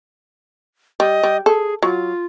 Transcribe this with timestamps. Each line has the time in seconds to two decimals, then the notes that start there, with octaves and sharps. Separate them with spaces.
1.00 G3 D#5
1.23 G3
1.46 G#4 A4
1.83 F#3 F4